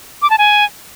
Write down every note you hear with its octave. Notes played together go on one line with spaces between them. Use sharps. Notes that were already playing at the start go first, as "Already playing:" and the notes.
D6
A5
G#5